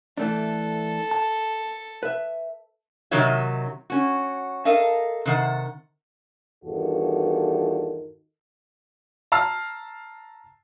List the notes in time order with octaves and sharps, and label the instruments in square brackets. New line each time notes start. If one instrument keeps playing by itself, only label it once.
[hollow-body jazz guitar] E3 A3 D4 [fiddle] A4
[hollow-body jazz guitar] A5
B4 E5
[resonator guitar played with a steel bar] C3 D#3 F#3 D#4 C#5 E5
C#4 F#4
A4 A#4 D#5 F5
C3 D#3 F#5
[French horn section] E2 G2 D#3 F4 F#4 A4
[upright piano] A5 A#5 E6 F6 C7